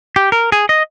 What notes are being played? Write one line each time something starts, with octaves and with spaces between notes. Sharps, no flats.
G4
A#4
G#4
D#5